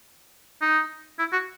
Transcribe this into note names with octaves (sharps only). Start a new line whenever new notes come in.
D#4
E4
F#4